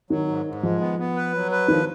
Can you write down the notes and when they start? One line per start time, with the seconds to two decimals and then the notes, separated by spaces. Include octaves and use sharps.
0.10 D#3 F#3
0.28 G#2
0.45 G#2
0.63 F3 G#3
0.80 B3
0.99 B3
1.16 B4
1.34 F#3
1.52 B4
1.68 D#3 F3